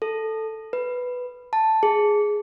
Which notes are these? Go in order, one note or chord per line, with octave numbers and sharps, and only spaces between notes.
A4
B4
A5
G#4